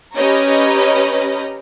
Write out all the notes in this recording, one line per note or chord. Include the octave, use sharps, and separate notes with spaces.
C#4 G4 B4 C#5 D#5 A#5